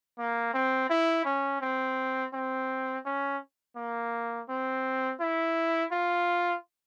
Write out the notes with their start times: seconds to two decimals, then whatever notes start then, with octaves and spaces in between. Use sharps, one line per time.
0.18 A#3
0.54 C4
0.90 E4
1.25 C#4
1.61 C4
2.34 C4
3.06 C#4
3.76 A#3
4.49 C4
5.20 E4
5.92 F4